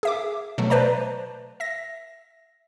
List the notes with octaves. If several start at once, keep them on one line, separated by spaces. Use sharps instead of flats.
G#4 E5 D6
B2 F#3 A3
B4 C5 D5 A5 A#5
E5 A#6